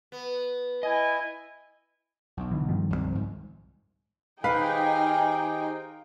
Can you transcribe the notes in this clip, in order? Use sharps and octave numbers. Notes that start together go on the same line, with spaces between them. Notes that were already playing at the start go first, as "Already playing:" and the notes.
B3
E4 D#5 G#5
B1
D3 E3
G2 D#3 F3
C#2 F#3 C4
C2 G#2
D#3 D#4 G4 G#4 B4 C5 F5 G5